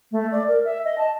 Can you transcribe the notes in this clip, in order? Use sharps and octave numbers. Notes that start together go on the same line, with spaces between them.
A3
D5
A#4
E5
D#5
A5